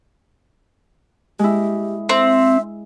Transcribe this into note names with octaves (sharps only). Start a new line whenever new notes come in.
G#3 E4 G4
C4 E5